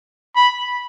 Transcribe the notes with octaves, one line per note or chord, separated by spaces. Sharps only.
B5